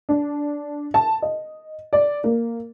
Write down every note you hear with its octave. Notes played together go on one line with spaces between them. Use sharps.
D4
A5
D#5
D5
A#3